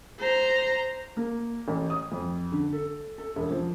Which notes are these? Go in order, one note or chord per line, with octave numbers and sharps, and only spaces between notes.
C5 A#5
A#3
A1
D#6
F2
D3
A4
A4
E1
F3